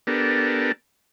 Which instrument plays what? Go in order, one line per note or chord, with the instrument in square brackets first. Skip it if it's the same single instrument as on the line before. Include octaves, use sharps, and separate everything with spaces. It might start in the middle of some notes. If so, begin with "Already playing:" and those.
[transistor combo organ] B3 D4 G4 A4 A#4